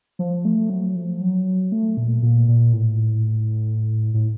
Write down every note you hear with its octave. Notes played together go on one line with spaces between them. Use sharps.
F3
A3
F#3
F3
F#3
A3
A#2
A#2
A#2
A2
A2